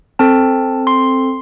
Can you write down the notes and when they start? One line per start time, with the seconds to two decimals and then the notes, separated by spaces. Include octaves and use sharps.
0.19 C4 A4 A5
0.87 C6